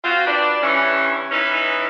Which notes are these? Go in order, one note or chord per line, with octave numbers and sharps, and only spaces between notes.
C4 F4 F#4
D4 B4 D5
G2 E3 C#4
E3 G#3 C#4 D#4 E4 B4